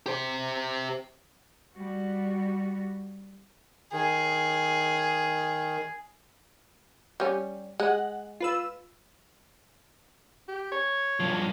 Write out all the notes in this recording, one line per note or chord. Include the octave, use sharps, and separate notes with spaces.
G4 C5
G3 F#4
D#3 G#4
G3 C#4
G#3 F#5
F4 B4 E6
G4
C#5
G2 F3